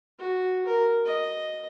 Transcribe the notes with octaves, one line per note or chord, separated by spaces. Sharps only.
F#4
A#4
D#5